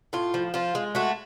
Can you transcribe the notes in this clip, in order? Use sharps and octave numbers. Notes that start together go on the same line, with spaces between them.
A2 F4
F3
F3 F4
G#3
A3 F#4